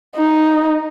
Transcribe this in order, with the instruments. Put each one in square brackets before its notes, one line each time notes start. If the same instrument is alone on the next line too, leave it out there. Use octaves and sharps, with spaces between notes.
[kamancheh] D#4